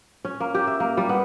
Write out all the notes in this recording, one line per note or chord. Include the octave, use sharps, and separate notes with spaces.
C#4
A#3
G4
E5
A#3
G3
B3